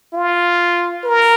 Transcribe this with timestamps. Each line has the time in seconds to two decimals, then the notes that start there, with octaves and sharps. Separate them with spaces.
0.14 F4
1.05 A#4